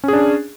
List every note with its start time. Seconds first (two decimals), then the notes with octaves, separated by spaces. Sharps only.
0.04 C#4
0.08 G#4
0.13 D4